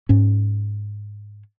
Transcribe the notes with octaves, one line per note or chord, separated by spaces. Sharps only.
G#2 C#4